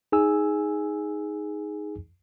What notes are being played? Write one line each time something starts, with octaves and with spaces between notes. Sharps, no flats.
D#4 G#4 G#5 E6